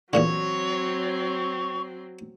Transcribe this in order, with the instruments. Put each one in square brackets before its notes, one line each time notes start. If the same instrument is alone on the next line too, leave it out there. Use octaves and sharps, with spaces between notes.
[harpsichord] E2 A#2 D3 [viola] F#3 C4 [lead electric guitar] C#5